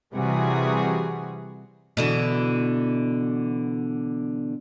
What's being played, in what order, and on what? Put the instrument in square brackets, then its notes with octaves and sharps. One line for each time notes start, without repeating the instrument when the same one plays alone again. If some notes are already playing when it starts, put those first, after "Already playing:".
[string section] C3 E3 G3 F#4 G#4
[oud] B2 D3 E3